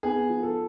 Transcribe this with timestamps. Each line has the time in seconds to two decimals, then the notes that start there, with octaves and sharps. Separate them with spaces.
0.03 B3 G#4
0.29 F3
0.43 A4